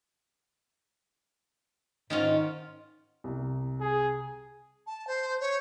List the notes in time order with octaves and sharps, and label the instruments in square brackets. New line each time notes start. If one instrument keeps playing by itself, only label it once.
[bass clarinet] G#2 [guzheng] D#3 C#4 F4
[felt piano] C2 C3
[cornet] G#4
[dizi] A5
C5
C#5